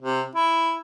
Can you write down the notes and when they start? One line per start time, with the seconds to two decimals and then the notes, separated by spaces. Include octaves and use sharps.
0.02 C3
0.35 E4